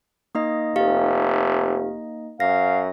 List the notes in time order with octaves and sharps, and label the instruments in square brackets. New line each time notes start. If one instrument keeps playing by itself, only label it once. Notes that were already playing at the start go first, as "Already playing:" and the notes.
[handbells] A#3 D#4 D#5
[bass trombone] F1 [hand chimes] G4 F5
[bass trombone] F#2 [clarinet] F5 [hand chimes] A#6